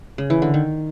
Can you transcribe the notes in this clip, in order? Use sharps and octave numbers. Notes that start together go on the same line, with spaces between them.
C#3
E3
D3
D#3